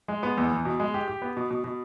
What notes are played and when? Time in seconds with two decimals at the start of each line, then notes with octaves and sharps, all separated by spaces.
0.08 G#3
0.23 B3
0.38 E2
0.52 E2
0.65 B2
0.80 G#3
0.94 G4
1.08 G4
1.22 B3
1.37 B2
1.51 B2
1.64 B2